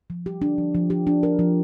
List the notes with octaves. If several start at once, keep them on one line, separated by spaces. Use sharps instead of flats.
F3
G4
D4
F3
F3
G4
D4
A#4
F3